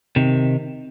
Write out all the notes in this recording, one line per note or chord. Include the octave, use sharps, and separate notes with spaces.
C3 D#3